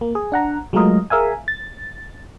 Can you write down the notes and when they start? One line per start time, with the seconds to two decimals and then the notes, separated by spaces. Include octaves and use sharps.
0.01 A#3
0.15 G#4
0.32 D4 F#5 A#5
0.73 F#3 G#3 A3 F4 A#4 D#5
1.10 G#4 A#4 E5 F5 G#5
1.48 A6